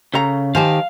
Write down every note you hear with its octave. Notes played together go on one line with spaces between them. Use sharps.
C#3 A4 F5 A#5
D#3 G4 C5 F5 G#5 A5